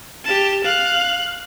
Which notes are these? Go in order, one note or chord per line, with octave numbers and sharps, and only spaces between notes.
G4 A5
F5 F#6